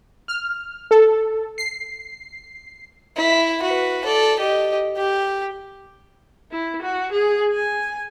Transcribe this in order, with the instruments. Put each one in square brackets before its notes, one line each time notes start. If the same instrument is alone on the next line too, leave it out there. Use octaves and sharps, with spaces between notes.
[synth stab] F6
A4
C7
[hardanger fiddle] E4
F#4 B4
A4 D5
G4 D#5
G4
[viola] E4
F#4
G#4
G#5